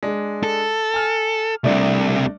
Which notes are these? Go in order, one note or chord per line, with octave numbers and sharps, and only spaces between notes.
G#3 D4
A4
G#5 F6
C2 C3 A3 D4